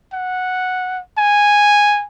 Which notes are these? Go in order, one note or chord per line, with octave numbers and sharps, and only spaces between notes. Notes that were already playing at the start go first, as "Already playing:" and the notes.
F#5
G#5